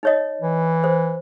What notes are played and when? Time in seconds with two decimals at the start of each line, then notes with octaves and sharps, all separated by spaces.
0.03 D#4 C#5 D#5
0.41 E3
0.84 C5